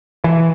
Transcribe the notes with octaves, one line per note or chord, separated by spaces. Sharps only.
E3